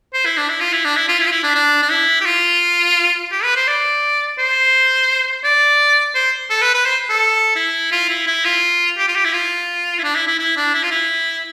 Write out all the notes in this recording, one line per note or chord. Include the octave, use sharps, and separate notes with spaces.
C5
E4
D4
E4
F4
E4
D4
E4
F4
E4
F4
E4
D4
D4
D4
E4
G4
F4
G4
B4
C5
D5
C5
D5
C5
A4
B4
B4
C5
A4
E4
F4
E4
E4
F4
G4
F4
G4
E4
F4
E4
D4
E4
E4
E4
D4
E4
F4
E4